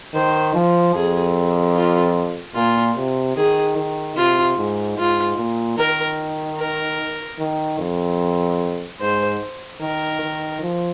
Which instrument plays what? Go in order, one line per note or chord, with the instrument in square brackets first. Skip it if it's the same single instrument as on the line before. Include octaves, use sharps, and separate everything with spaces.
[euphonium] D#3 [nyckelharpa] C5
[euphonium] F3
[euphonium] F2 [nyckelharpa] G#4
[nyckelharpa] F4
[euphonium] A#2 [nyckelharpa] F4
[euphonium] C3
[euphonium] D#3 [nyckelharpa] G#4
[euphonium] D#3
[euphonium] C3 [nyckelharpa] F4
[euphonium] G#2
[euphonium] G#2 [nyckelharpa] F4
[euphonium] A#2
[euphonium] D#3 [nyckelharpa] A#4
[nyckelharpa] A#4
[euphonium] D#3
F2
[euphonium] G#2 [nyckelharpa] C5
[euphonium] D#3 [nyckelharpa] A#4
[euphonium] D#3
F3